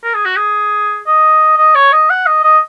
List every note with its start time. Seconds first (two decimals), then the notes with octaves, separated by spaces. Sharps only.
0.03 A#4
0.14 G#4
0.25 F#4
0.37 G#4
1.07 D#5
1.58 D#5
1.75 C#5
1.92 D#5
2.10 F#5
2.27 D#5
2.43 D#5